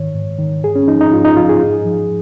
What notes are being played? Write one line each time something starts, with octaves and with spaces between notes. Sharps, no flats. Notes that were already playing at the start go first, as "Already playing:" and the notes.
Already playing: G#2 D#3 C#5
G#2
D#3
G#2 G#4
C#4
F3 D#4
D#4
G#2 F4
D#4
F3 F4
G#4
G#2
F3